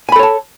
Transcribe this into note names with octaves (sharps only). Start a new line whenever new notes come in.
A4 C#5 G#5 A5 B5